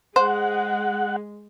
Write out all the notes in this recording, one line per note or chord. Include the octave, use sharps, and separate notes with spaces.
G#3 C5 F#5